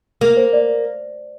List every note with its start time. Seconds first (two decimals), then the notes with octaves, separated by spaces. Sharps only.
0.21 A#3
0.37 C5
0.53 D5